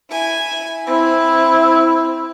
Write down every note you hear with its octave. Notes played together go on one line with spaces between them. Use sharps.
E4 G#5
C4 E4